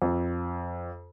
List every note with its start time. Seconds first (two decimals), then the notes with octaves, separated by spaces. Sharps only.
0.02 F2